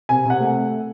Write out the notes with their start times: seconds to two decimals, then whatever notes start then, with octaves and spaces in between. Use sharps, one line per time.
0.09 C3 G#5
0.25 C3 F#5
0.40 A3